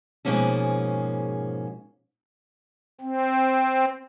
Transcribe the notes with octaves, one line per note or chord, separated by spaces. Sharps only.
G#2 B2 F3 A#3 C#4 G#4
C4